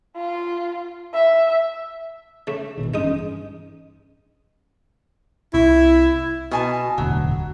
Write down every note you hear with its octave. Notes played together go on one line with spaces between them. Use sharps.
F4
E5
C#3 A3
G#1 B2 D#3
G2 E3 G#3 C#4 D#4 D#6
C2 E4
B2 G#5 A5
E1 A1 D2 F#3